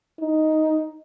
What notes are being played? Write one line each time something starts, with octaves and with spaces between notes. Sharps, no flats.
D#4